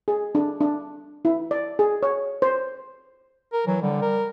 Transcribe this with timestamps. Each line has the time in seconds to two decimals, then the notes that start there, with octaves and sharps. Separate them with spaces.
0.08 G#4
0.35 D4
0.61 D4
1.25 E4
1.51 D5
1.79 G#4
2.03 C#5
2.42 C5
3.53 A#4
3.67 E3 F#3
3.82 D3 G3
4.02 A#4